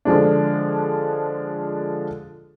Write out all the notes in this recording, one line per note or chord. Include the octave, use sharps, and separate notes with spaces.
D3 F3 G#3 D4